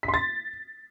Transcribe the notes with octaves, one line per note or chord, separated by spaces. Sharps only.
B6
C6
A6